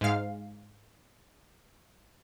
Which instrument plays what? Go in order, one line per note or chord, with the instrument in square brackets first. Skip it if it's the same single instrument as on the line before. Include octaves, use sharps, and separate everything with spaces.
[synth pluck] G#2 G#3 F5